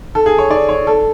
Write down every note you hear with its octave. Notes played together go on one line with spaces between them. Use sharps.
A4
G#4
C#5
D5
C#5
A4